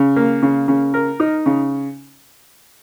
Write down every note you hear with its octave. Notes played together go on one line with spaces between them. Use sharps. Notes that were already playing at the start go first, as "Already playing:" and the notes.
Already playing: C#3
A#3
C#3
C#3
A#4
D#4
C#3